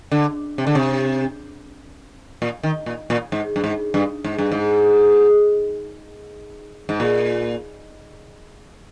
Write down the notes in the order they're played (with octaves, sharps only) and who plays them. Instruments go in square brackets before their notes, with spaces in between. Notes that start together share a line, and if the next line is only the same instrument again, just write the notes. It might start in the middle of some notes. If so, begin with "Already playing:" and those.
[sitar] D3
C3
D3
C3
A#2
D#3
A#2
A#2
G#2
G2
G#2
G2
G#2
G2
G#2
G#2
A#2